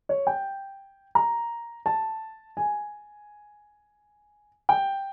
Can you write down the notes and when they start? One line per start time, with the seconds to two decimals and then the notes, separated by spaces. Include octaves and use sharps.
0.09 C#5
0.27 G5
1.15 A#5
1.86 A5
2.57 G#5
4.69 G5